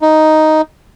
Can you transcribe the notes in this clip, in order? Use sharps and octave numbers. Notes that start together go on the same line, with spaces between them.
D#4